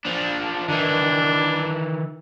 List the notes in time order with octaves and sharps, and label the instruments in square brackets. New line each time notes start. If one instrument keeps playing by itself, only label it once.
[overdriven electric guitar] F3 D4
[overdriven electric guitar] D#3 E3 [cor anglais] D4